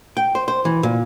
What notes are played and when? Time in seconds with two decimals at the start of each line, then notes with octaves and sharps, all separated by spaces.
0.17 G5
0.35 C5
0.48 C5
0.65 E3
0.83 A#2